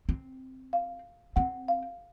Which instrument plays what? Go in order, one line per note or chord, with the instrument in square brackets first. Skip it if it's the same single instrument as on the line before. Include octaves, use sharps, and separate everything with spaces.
[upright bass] C4
[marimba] F5
[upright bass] C4 [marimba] F#5
[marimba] F5